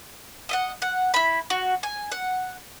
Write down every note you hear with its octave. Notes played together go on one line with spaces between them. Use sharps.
D#5 E5 F#5
F#5
E4 B5
F#4
G#5
F#5